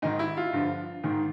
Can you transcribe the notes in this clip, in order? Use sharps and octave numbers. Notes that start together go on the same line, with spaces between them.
G#2 D#3 D#4
E4
F4
G2 D3 F3
G#2 D#3